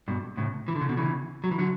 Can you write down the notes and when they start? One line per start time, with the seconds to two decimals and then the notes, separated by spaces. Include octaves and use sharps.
0.08 G2 B2
0.37 A2 C#3
0.68 E3
0.75 D3
0.81 C#3
0.89 B2 D3
0.97 C#3 E3
1.44 F#3
1.51 E3
1.59 D3 F#3